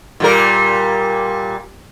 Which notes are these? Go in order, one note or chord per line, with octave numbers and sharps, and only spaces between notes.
A#2 G3 A#4